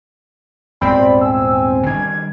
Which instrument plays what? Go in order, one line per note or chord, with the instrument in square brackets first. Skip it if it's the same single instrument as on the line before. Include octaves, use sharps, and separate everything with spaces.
[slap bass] D#1 G#2 B3 [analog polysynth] C4 [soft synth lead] D5 [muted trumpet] B5
[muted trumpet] G#5 [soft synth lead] E6
[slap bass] D#3 G3 D4 [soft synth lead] G#6